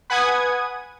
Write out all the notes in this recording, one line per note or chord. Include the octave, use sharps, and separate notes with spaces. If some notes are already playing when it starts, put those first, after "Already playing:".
B4 F#5 G#5 D#6 G#6